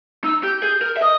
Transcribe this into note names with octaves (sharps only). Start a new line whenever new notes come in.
D#4 E6
G4 G6
G#4 G6
A#4
E5
D#5 D#6